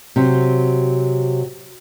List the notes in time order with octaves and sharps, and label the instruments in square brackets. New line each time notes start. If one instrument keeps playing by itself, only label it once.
[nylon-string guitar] C3 F#3